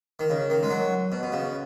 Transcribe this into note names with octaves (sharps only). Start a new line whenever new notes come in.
D#3
C#3
D#3
G#3
F#3
B2
B2
C#3